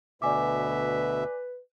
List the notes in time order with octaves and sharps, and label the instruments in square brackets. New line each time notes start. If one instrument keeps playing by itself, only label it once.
[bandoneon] D2 B2 E5 [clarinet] B4 [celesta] D5 G#5 D6